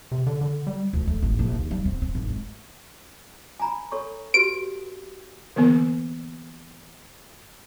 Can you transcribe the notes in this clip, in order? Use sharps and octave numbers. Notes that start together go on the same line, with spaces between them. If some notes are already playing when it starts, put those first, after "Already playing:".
C3
D3
D3
G3
D2
A3
G#1
A#1
D#2
G3
C4
C4
G#1
G#3
G#5 A#5 B5
A4 C#5 C#6
F#4 G4 B4 D7
D3 E3 A#3 B3